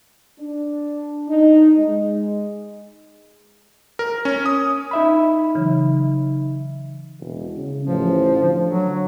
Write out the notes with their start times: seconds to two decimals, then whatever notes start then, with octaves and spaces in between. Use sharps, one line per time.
0.38 D4
1.28 D#4
1.76 G#3
3.99 A#4
4.25 C#4
4.46 D#6
4.91 D#4 E5 B5
5.55 C#3 E3 F#3
7.20 E1
7.57 C#3
7.87 A1 F3
8.39 D3
8.70 F#3